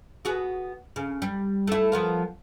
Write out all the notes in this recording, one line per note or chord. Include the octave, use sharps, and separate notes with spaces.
B3 F#4 G#4
C#3
G3
A3 E4
F3 B3 A#4